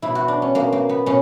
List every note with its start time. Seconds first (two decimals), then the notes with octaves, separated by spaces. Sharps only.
0.02 B2 E4
0.15 F#4
0.28 D4
0.42 C#4
0.55 B2 A#3
0.72 A#3
0.89 B3
1.06 B2 C#4